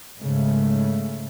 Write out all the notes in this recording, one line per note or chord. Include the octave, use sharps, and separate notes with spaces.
G#2 C#3 G#3 A3